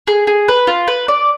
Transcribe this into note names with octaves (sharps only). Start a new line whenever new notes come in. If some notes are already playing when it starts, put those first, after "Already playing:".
G#4
G#4
B4
F4
B4
D5